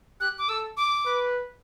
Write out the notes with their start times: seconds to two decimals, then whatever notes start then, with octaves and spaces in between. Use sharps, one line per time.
0.20 G4 F#6
0.38 D6
0.49 A4 E6
0.77 D6
1.06 B4